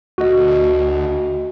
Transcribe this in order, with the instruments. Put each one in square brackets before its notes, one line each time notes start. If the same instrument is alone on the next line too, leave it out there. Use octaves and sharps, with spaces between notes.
[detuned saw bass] D2 [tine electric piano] F#4 D#5